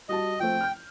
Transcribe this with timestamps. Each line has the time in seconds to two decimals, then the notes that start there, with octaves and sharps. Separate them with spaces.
0.09 G3 F#4 D#5 A5
0.40 F3 A3 C4 G5
0.61 F6 G6